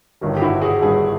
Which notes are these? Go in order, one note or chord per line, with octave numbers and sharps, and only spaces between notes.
G1 G2 D#3 G3
G4
E4 F#4
F#4 G#4
G1 G2 D#3 G3 F#4 G#4